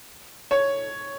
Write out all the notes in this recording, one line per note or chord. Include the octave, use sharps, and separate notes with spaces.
C#5